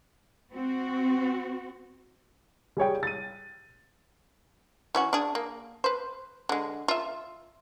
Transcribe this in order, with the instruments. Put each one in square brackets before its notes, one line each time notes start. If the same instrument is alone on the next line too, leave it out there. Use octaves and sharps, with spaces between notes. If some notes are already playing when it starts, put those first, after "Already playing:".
[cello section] C4 F#4
[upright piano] G3 G#4 C#5 G5
A6 D#7
[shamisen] E3 C#4 F#4
D4 G#4
A#3
B4 C5
D3 G#3
F4 E5